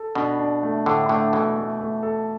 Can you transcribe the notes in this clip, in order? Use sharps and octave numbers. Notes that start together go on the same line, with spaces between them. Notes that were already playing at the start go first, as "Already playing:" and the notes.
Already playing: A4
B2 D4
D4
A3
A2 D3 A4
A2 D3 A3
B2 E3 A3
A3
A3
A4